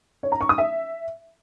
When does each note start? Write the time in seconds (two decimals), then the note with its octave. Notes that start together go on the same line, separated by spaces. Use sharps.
0.23 C#5
0.32 A#5
0.41 C#6
0.49 D#6
0.58 E5